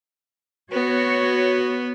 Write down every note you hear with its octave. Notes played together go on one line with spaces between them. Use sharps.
B3 F#4 C#5